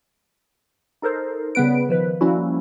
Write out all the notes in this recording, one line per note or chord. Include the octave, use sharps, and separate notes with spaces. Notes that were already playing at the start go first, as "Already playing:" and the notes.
D#4 A4 A#4 C5
C#3 G3 B3 B4 D7
D#3 F3 B4
F3 G3 A#3 C#4 E4 F#4